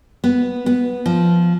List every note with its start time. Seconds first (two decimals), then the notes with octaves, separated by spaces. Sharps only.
0.24 B3
0.66 B3
1.06 F3